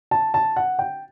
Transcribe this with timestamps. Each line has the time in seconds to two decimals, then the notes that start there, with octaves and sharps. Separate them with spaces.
0.11 A5
0.34 A5
0.56 F#5
0.79 G5